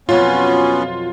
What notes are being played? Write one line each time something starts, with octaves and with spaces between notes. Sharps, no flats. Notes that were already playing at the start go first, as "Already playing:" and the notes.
F2 B2 F#3 B3 C#4 F4